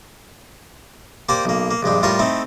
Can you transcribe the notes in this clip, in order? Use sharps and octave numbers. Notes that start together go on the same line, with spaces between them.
A#3 G4 C5 D5 D6
B1 A#3
A#3
A#1 G2 G#3 G4
A2 G3 F4 A#4 C6 C#6
A3 C4 D#4 E4